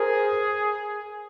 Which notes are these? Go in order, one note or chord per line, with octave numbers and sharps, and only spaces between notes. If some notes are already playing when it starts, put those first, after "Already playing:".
Already playing: G#4 A#4 C5